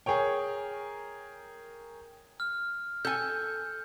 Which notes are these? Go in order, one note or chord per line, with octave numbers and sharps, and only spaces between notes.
G#4 A#4 C#5 G5
F6
A4 G#5 G6